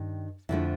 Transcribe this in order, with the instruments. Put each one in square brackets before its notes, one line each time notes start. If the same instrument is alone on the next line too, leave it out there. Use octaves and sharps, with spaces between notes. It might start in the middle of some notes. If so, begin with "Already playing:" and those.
Already playing: [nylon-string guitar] G2 D#3
F2 D3 F3 A3 E4